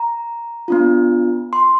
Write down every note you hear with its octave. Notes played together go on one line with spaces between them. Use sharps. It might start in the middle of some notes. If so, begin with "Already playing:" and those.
Already playing: A#5
B3 D4 F4
C6